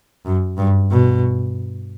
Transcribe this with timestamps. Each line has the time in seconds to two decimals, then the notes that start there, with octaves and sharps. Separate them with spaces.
0.26 F#2
0.58 G2
0.91 B2